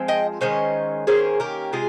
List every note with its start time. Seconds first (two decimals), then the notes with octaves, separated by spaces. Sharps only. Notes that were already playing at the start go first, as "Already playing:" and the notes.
Already playing: F3 G#3 C4
0.08 D#5 G5
0.41 D#3 G#3 C#4 C5 D#5
1.07 D#3 A#3 C#4 G#4 C5
1.40 G4 A#4
1.72 C3 G#3 F4 G#4